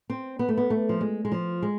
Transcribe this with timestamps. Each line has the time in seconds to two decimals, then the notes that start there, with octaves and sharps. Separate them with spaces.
0.10 C4
0.39 B3
0.49 A3
0.57 B3
0.70 A3
0.89 F3
1.01 G#3
1.25 G#3
1.32 F3
1.63 G#3